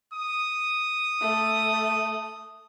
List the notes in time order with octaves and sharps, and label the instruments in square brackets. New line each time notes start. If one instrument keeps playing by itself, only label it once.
[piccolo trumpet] D#6
[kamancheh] A3